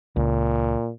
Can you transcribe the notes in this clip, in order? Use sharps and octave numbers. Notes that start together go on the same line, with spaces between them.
C#2 A#2